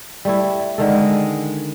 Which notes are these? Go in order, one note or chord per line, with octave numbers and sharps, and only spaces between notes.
G3 A3 E4
D3 D#3 G#3 A4